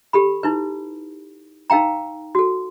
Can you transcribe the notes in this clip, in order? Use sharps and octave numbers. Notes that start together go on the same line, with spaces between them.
G4 A4 B5
D#4 E4 B4
D#4 A#4 F5 G5 A#5
F#4 A4